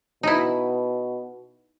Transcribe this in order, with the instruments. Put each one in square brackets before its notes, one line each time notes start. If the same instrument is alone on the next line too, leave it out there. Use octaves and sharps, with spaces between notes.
[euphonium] B2 [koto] D#4 E4